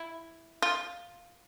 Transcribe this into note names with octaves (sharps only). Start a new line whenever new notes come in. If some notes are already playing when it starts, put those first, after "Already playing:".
Already playing: E4
F4